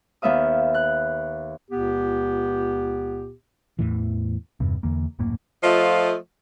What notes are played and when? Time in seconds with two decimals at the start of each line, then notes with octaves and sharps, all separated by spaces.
0.22 D#2 B3 E5 F5 D#6
0.74 F#6
1.69 C#2 A#2 B3 G4
3.79 E2 A2 E3
4.60 E2 G2 C3
4.83 E2 D3 E3 A#3
5.19 D#1 F#2 A2 A#3
5.63 F3 A3 F4 C5 D#5